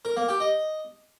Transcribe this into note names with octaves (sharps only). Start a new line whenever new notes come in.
A#4
A#3
G4
D#5